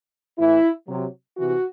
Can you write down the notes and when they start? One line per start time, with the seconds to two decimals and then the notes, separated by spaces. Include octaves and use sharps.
0.39 A2 E3 E4
0.88 C3 F#3
1.37 C3 E3 F#4